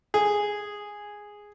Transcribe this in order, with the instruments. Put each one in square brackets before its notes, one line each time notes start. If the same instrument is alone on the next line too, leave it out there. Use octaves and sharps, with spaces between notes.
[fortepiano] G#4